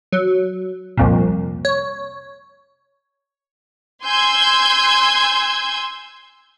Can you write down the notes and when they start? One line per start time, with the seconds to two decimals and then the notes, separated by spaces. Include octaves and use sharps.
0.12 F#3
0.97 C2 F2 A#2
1.65 C#5
4.03 G#5 C6 E6 G6 G#6